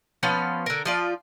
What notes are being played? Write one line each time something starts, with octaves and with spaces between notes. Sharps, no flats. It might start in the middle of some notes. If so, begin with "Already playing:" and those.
F3 B3 C#4 F5
D3 A#4
F3 F4 D5